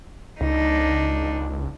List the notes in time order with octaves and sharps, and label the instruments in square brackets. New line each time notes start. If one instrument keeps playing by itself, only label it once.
[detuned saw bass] C#2 [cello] D4 D#4